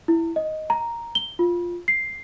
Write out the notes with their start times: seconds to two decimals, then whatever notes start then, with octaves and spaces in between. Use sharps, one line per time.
0.08 E4
0.36 D#5
0.70 A#5
1.15 G7
1.39 F4
1.88 C7